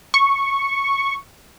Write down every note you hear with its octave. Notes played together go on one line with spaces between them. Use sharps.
C#6